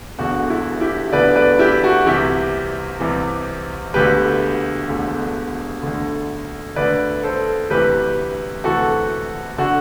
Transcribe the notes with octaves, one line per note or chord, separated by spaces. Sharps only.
E1 E2 D3 F#4
E4
E4 G4
E1 E2 D3 B4 D5
B4 D5
E4 G4
F#4
C2 C3 E3 E4 G4
C2 C3 E3
E1 D2 D3 G4 B4
E1 D2 D3
D2 D3
D2 D3 B4 D5
A4 C5
D2 C3 E3 G4 B4
D2 C3 E3 F#4 A4
D3 F#4